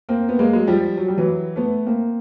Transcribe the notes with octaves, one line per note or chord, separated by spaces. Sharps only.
A#3 C4
B3
G#3 A#3
F#3 G#3
F3 G3
F#3
G3
E3 F#3
A3 B3
A#3 C4